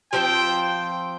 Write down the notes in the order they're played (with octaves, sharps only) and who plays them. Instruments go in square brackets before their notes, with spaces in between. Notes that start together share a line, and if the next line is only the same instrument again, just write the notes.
[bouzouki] F3 C4 F4 C5 [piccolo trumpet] G5